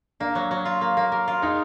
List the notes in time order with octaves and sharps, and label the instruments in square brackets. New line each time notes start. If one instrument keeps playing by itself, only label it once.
[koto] A#3 [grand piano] D4
[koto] F#3
F#3
F4
A#3
A#3
A#4
F4
[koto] G#3 [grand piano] D#4